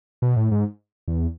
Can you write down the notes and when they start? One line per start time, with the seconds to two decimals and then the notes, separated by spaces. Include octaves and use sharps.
0.22 B2
0.36 A2
0.51 G#2
1.08 E2